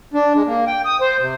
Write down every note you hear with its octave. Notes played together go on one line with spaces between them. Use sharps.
D4
G#3
A#3
G5
D#6
C5
C3